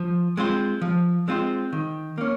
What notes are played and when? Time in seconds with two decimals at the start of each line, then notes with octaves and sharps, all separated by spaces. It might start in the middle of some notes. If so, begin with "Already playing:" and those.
Already playing: F3
0.37 G#3 C4 F4 C5
0.82 F3
1.28 G#3 C4 F4 C5
1.73 D#3
2.18 A#3 C#4